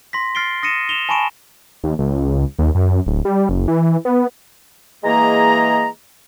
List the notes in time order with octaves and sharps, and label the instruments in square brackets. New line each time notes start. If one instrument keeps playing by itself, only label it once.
[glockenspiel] C6 A#6 B6
F6 A6 C7 D7 G7
D#6 A#6 C#7 D#7 E7
E7 F7 G7
G#5 A5 B5 C#6 D7 E7
[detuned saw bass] D#2
C#2
D#2
F#2
D1
G3
F#1
E3
B3
[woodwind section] E3 G#3 A#3 G#4 D#5 A#5